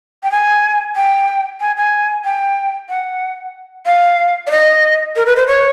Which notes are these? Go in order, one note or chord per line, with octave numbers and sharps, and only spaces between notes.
G5
G#5
G5
G#5
G#5
G5
F#5
F5
D5
D#5
A#4
B4
C5
C#5